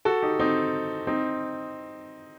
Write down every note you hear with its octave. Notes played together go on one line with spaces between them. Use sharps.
F#4 A4
D#4 G4
C4 D#4
C4 D#4